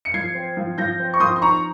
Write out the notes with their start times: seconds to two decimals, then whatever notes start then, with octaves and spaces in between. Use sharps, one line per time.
0.05 C#7
0.14 F3 G#6 C7
0.35 C4
0.57 F3
0.78 F3 G6 A#6
1.00 C4
1.14 C#6
1.20 F3 C6 D#6
1.36 C6
1.42 D#4 A#5 C#6